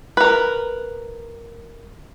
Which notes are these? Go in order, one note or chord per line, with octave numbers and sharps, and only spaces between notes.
A#4 B4